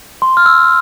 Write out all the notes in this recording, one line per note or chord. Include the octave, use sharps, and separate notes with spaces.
C6
F6
E6